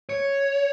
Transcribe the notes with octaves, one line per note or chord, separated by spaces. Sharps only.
C#5